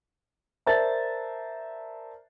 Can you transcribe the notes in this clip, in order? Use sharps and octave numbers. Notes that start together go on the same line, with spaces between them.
A#4 C5 D5 E5 A5 A6